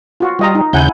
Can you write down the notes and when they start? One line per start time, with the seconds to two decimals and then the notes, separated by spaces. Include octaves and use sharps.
0.20 F4 F#4
0.39 G3 F4 D#5 A#5
0.55 D#4
0.73 D#2 C#3 E4 F#5 G#5 G6